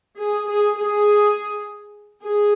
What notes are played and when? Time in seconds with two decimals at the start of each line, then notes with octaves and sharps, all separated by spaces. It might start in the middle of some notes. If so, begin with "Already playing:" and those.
0.19 G#4
0.49 G#4
0.78 G#4
2.24 G#4